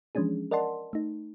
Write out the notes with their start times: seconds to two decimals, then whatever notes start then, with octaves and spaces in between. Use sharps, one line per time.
0.15 E3 F3 G#3 C#4 D4 G#4
0.51 A#4 D5 D#5 F#5 A5 C6
0.93 A3 D#4